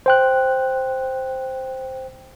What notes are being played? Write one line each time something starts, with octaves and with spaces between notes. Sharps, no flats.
C5 G5 F#6